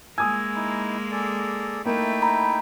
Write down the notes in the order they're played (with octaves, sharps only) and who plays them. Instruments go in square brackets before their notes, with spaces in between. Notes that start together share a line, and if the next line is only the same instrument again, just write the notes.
[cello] G#3 A#3 [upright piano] G#5 D#6 [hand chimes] E6 G#6
[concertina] D#4 E4
G#4 A4 D5
[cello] A3 [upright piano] A#3 [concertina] D#4 E4 G5
[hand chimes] A#5 B5